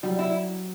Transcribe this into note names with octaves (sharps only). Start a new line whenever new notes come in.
F#3 G3
E4